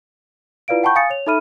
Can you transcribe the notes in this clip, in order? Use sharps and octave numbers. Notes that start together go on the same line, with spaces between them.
E4 F4 B4 D5 F5 D7
F#5 G5 A5 B5 C#6 G6
F5 G#5 D#6 A6 C#7
C#5 F7
D#4 A4 E5 B5 F6 D#7